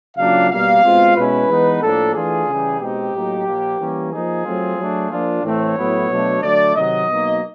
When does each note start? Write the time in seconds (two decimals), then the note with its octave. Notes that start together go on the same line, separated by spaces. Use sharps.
0.17 C#3 F#3 A#3 D4 F4 F5
0.50 B2 G3 A#3 F5
0.83 B2 G#3 C4 F4
1.16 B2 G#3 C#4 E4 B4
1.48 E3 G#3 B3 D#4
1.82 A2 F3 A#3 D4 A4
2.15 E3 A3 D4 F4 G#4
2.47 C#3 E3 G3
2.80 B2 G#3 C4 D#4 G4
3.13 A2 F#3 A#3 D#4
3.46 A#2 F3 A#3
3.79 E3 G3 A#3 C#4
4.12 F3 A#3 D#4 G#4
4.45 F#3 A3 C4 F4
4.77 F#3 A3 D4
5.11 F3 A#3 D4 F4
5.43 A2 E3 A3 C4 C#5
5.76 A2 F#3 B3 E4
6.09 B2 F#3 A3 D4
6.42 D3 F#3 A3 D5
6.75 C3 D#3 F#3 D#5
7.08 B2 F#3 A#3 D#4